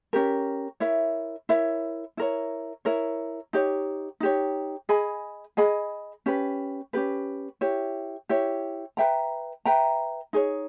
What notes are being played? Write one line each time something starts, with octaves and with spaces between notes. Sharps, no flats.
C#4 G4 A#4
E4 A#4 C#5 E5
E4 A#4 C#5 E5
E4 A#4 C#5
E4 A#4 C#5
D#4 G4 C#5
D#4 G4 C#5
G#4 D#5 G#5 B5
G#4 D#5 G#5 B5
C#4 G4 B4
C#4 G4 B4
E4 G4 C#5
E4 G4 C#5
B4 E5 G5 A#5
B4 E5 G5 A#5
D#4 G#4 C#5